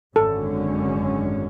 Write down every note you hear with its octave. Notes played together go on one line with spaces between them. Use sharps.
G#1 F#2 D3 G#3 C#4 A4